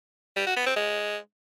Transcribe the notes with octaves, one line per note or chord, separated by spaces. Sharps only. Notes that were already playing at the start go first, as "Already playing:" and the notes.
G3
F#4
B3
C4
G#3